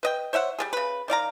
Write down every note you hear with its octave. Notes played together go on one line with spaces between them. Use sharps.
B4 D#5 G5
C5 C#5 E5 F#5
G3 B3 G#4
C#3 B4
D#3 D5 F5 A#5